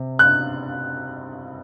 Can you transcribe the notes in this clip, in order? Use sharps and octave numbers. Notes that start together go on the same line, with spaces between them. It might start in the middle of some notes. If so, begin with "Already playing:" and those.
Already playing: C3
F#6